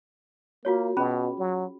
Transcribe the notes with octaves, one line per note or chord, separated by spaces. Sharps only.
A#3 F4 F#4 C#5
B2 C#4 G#4 B5
F#3